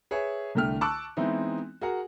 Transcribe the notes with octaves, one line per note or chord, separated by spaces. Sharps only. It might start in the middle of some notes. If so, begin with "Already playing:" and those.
G#4 B4 C#5 E5
C2 D3 A3 G5 F6
A5 C#6 D6 E6 F#6
E3 G#3 B3 C4 D#4 E4
F#4 G#4 A#4 F#5